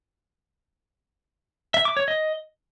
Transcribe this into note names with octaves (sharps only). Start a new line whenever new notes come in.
E5
D6
C#5
D#5